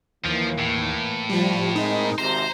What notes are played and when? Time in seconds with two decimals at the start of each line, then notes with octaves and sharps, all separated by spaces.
0.25 D#2 E3 F3 A#3
0.59 A2
1.29 F3 G3
1.76 G#3 C4 D#4 A#4
2.18 G#1 C3 C5 A#5